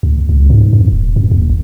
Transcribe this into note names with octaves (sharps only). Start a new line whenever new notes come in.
D2
C#2
G#2
F2
D#1
F#2
D#2
G1